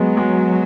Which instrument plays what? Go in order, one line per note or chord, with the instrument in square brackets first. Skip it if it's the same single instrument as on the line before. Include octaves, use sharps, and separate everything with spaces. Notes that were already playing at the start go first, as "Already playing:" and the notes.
Already playing: [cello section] F#3 [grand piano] G#3 B3
[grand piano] G#3